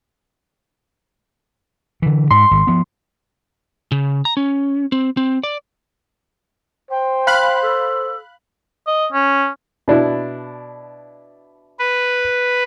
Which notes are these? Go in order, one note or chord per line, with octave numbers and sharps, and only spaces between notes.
D3 E3
G#2 G#3 C6
G#1
F3 B3
C#3
A#5
C#4
C4
C4
D5
C5 G5
F5 B5 F#6
A4
D#5
C#4
B2 D4 E4
B4